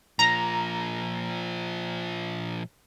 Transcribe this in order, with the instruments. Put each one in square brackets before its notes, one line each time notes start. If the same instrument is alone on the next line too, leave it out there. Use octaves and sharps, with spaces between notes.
[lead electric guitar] A#2 F3 [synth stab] A#5